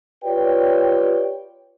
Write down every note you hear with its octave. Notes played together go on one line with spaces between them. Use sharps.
F4 G4 B4 C#5 D5 G5